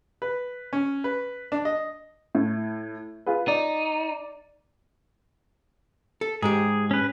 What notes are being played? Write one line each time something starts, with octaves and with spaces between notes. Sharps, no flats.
B4
C#4
B4
D4
D#5
A2
F4 G#4 B4
D#4 D5
A4
G#2 G#3 G4 G#4
C#4 B4